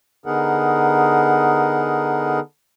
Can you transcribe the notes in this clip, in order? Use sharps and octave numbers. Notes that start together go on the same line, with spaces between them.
D3 B3 D#4 G#4 A#4 F#5